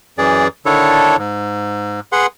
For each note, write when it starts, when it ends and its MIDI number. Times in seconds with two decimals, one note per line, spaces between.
0.18 0.48 42
0.18 0.48 52
0.18 0.48 68
0.18 0.48 74
0.66 1.16 50
0.66 1.16 51
0.66 1.16 62
0.66 1.16 64
0.66 1.16 69
0.66 1.16 73
1.18 2.00 44
2.12 2.26 68
2.12 2.26 71
2.12 2.26 78
2.12 2.26 84